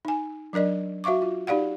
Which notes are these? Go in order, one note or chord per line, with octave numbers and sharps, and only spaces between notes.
D#4 G#5
F#3 D4 A#4 D5 D#5
F#4 E5 F5 C#6 D6
F4
D#4 G4 D5 F5 F#5